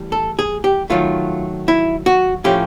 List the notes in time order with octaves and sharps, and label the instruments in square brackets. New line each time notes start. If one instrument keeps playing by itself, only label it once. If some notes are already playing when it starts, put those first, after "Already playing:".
Already playing: [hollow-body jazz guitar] A2 E3 G3
A4
G#4
G4
D#3 F#3 A3 F4
E4
F#4
A2 F3 A3 C#4 G4